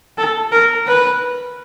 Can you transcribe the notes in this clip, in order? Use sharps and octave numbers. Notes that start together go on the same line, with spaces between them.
A4
A#4
B4